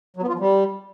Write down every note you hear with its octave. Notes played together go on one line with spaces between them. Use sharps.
F#3
B3
F4
F3
G3